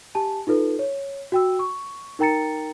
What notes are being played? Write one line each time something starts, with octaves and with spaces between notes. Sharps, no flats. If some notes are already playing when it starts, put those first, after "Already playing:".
G4 G#5 A5
D#4 F4 A4 B4
C#5
F#4 G5 E6
C#6
D#4 A#4 G5 A#5 A6 C#7